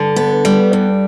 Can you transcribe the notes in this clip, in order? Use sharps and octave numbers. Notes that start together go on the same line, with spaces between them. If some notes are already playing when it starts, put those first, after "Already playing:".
Already playing: G2 D3
B3
G3
G2